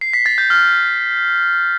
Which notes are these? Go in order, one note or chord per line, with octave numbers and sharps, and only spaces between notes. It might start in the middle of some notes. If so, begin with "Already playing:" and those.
C7
B6
A6
G6
F6